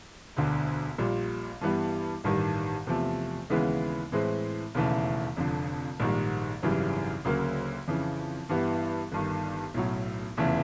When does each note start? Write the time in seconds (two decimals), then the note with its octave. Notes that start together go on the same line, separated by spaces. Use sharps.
0.37 E1 D2 D3
0.98 A#1 A#2 G3
1.61 G2 E3 G3 B3
2.24 A1 G2 D#3 G3
2.87 E2 C3 F3 A3
3.50 D#2 C#3 E3 G#3 B3
4.12 A2 E3 G#3 C4
4.75 E1 D#2 C#3 E3 A3
5.36 F1 F2 D3
6.00 A#1 G#2 D#3 G3 A#3
6.63 G#1 F#2 C#3 E3 G3
7.25 D2 C#3 F#3 A#3
7.88 F2 C#3 E3
8.49 G2 E3 G3 B3 E4
9.12 G1 G2 D#3
9.74 B1 A2 F#3
10.37 F1 E2 C#3 E3 A3